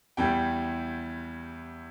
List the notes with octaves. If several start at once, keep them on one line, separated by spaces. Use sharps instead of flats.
E2 E3 G3 G5